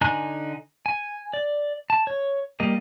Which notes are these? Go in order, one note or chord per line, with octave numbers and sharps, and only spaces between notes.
D3 D#4 G#5 A#5 F#6
G#5
D5
A5
C#5
G3 A#3 D#5